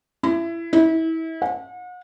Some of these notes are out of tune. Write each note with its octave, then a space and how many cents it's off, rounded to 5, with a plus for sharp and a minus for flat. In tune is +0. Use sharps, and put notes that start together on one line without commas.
E4 +20
E4 -30
F#5 -40